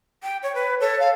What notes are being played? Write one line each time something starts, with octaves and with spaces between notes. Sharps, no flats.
G5
C#5
B4
A4 C#5
F5